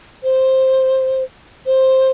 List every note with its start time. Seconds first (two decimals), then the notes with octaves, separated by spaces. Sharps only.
0.23 C5
1.66 C5